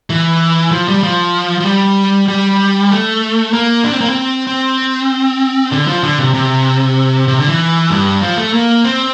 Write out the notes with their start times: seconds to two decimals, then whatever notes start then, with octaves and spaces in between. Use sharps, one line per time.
0.10 E3
0.72 F3
0.88 G3
1.03 F3
1.60 F3
1.65 G3
2.28 G3
2.91 A3
3.53 A#3
3.84 D4
3.93 C4
4.01 A#3
4.09 C4
4.47 C4
5.72 D3
5.87 F3
6.03 D3
6.19 C3
6.34 C3
7.28 C3
7.39 D3
7.49 E3
7.90 G2
8.21 F3
8.37 A3
8.53 A#3
8.84 C4